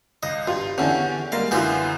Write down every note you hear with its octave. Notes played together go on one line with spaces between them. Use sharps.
C#2 D#5
G2 F4
E2 D3 C#4 D4 G4
G3 G#3 A#3 F5
F#2 D3 E3 B3 F4 C5